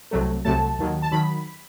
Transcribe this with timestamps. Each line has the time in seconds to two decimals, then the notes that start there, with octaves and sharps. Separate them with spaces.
0.11 C2 C3 F#3 A3
0.45 C2 C3 F#3 A3 A5
0.79 D#2 D#3 F#3
1.02 A5
1.12 D#3 F#3 B5